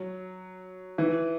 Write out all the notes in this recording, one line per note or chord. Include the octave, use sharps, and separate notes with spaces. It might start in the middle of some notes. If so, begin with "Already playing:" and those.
Already playing: F#3
E3